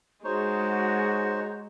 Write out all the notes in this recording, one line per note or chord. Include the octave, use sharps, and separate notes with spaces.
G#3 D#4 F#4 G#4 C5 C#5